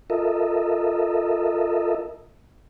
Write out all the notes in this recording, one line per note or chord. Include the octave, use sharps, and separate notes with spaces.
F4 A4 A#4 D#5 E5